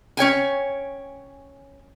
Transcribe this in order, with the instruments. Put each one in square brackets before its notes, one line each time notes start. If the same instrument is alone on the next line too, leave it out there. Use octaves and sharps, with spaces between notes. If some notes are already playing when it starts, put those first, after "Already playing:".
[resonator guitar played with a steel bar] C#4 C#5 G5 G#5